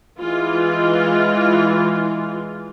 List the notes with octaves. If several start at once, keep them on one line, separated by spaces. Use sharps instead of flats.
E3 G#3 F4